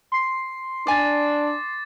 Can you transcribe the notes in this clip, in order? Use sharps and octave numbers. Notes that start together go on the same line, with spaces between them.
C6 C7
D4 D5 G#5 D6 A6